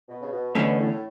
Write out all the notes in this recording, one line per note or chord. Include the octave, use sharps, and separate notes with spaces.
B2
C#3
B2
E2 B2 D3 A3 C#4
A2